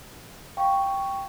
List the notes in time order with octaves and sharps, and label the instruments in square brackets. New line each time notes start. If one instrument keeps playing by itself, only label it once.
[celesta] F5 C#6 [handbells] G5